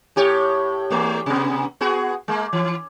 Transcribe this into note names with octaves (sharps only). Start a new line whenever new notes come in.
A2 G4 C#5
E2 A3
C3 B3
B3 F#4 G#4
G#3 A#3
E3